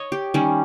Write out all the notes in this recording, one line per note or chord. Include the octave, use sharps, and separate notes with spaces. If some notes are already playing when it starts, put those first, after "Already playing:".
Already playing: C#5 D#5
G4
D#3 G3 C#4